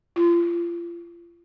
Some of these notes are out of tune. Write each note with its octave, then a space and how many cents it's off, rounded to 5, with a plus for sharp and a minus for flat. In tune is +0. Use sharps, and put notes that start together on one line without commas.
F4 -35